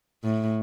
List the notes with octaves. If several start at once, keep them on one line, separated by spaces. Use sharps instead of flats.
A2